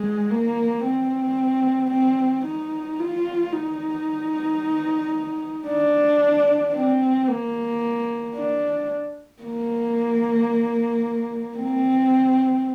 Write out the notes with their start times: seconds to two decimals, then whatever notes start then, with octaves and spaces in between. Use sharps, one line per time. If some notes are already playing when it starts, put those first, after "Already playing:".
Already playing: G#3
0.31 A#3
0.85 C4
1.91 C4
2.45 D#4
2.99 F4
3.52 D#4
5.67 D4
6.74 C4
7.28 A#3
8.35 D4
9.42 A#3
11.57 C4